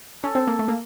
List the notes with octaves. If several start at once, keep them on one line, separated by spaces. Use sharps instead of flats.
C#4 A4
C4
A#3
A3
A#3